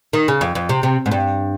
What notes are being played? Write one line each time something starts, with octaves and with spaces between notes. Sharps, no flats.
D#3
C#3
F2
F2
C3
C3
G#2
G2